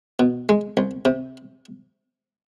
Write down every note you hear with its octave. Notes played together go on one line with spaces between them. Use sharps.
B2
G#3
C2
C3